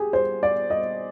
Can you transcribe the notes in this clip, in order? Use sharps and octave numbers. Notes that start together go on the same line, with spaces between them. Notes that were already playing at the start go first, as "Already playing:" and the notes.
Already playing: G4 G#4
C5
D5
D#5